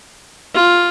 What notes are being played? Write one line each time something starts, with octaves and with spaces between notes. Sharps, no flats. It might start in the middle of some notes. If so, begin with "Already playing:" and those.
F4